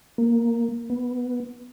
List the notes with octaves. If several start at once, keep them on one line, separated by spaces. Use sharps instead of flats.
A#3
B3